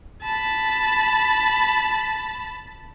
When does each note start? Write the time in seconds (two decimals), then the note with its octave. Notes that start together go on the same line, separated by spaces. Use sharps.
0.23 A5 B5